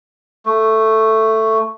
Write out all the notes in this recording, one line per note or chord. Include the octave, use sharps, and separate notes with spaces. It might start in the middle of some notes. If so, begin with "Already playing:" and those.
A3